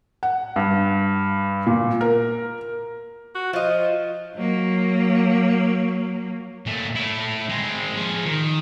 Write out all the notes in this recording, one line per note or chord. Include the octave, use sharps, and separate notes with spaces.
F#5
G2
A#2
A#4
F#4
F3 F4 D#5
F#3 A#3
A#2 A3
A3 E4
G#3 C4
F3 G#4
D#3